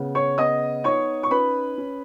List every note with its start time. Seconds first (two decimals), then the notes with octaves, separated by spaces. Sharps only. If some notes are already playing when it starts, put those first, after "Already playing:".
Already playing: C#3 B3
0.15 C#5 C#6
0.38 B3 D#5 D#6
0.84 D#4 C#5 C#6
1.23 C#6
1.31 C#4 B4 B5
1.78 C#4